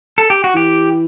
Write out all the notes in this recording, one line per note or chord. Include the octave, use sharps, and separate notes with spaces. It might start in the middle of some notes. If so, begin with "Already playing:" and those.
A4
G4
F#4
E3 G4